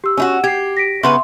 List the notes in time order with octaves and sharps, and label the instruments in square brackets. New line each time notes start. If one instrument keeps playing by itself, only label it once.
[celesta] G4 E6
[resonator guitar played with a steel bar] C#4 D#4 F#4
[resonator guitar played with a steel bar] G4 [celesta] G#6 C7
[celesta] A#6 B6 D7
[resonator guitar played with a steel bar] C#3 B3 B4 [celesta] E5 C6